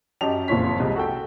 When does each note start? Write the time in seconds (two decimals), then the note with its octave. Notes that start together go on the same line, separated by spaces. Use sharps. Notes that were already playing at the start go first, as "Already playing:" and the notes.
0.21 F#2 C#4 G4 D#5 A5 F7
0.48 F#1 F2 A#2 C#5 B6
0.80 C2 G#3
0.96 F#4 A4 G5